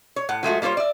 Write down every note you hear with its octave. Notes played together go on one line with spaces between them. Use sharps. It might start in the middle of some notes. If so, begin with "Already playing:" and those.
C#5
A2 F#5
F3 G#3 A3 F#4
G3 A#3 F4 C5 C#5
D5 E5